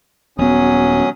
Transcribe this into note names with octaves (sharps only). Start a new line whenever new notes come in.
D#1 F#3 B3 C#4 D#6